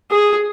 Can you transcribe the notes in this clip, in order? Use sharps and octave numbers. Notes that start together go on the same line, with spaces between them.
G#4